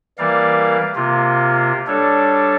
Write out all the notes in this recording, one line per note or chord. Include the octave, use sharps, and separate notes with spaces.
E3 G3 A#3 A#4 D5 F5
C3 A#3 F4
G3 D4 A4 C#5